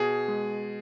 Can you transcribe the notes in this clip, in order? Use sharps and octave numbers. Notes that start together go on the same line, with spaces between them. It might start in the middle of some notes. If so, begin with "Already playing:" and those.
Already playing: B2 G#4
G#3